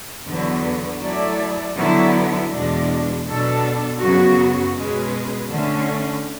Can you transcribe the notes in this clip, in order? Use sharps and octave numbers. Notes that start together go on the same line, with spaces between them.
E2 D3 F#3 B3
F#3 A3 E4 A4 D5
D3 F#3 B3 E4
E2 B2 G#3 D4
B2 F#3 B3 D4 A4
F#2 C#3 F#3 B3 F#4
B2 G#3 C#4 G#4 B4
D3 A3 C#4